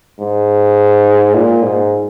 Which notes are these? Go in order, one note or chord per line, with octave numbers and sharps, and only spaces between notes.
G#2
A#2
G#2